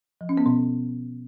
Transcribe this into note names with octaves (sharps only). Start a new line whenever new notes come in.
F3
C#4
B3
B2